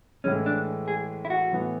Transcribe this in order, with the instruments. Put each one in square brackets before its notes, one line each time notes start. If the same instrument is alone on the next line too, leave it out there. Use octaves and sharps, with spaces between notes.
[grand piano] A2 E3 G#3 [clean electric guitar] C#4
[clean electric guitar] D4
G#4
E4
F#4
[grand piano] A2 E3 B3 E4